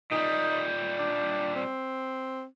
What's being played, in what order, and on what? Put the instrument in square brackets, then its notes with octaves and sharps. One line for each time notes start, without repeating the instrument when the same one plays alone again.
[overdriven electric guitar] A#2 G3 [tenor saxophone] D#4
[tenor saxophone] D4
C4